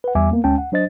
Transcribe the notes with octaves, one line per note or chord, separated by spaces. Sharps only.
B4 F#5
E2 G3 E5 G#5 D6
A#3 B3
D2 G#3 C#4 G5 A5
F#5
F#3 D4 C5 D#5 A6